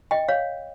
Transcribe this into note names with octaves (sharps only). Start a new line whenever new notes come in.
D#5 G5
C#5 F5